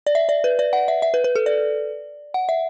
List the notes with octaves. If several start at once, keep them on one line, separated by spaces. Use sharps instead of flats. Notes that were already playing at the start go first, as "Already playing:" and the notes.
D5
E5
D5
B4
D5
F#5
E5
E5
B4
B4
A4
D5
F#5
E5